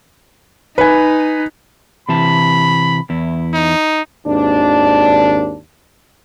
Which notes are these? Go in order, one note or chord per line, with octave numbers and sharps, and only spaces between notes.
D#4 B4 G#5
C3 E3 A5 B5
E2 E4
D#4
G#1 D#2 D4